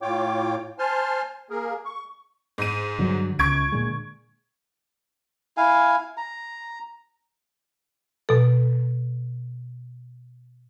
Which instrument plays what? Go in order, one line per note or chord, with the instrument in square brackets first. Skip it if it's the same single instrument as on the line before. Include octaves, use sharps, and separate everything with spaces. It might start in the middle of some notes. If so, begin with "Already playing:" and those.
[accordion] A2 F4 C#5 G5 D6
C5 G#5 A5 C6 F6
A#3 G#4 A#4
C#6
[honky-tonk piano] G#2 D#7
[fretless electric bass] G2 D3 F#3
[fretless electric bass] C#2 [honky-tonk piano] C#6 G#6 D7
[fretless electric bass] A#2 D3 G#3
[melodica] E4 F5 G#5
A#5
[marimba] B2 A4